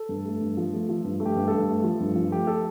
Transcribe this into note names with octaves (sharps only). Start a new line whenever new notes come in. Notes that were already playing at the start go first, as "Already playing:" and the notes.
Already playing: A4
G2
A3
G2
F3
A3
F3
G2
A3
G4
G2
G2 A4
A3
F3
G2
F3
A3 G4
A4